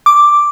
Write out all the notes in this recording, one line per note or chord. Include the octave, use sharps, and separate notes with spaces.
D6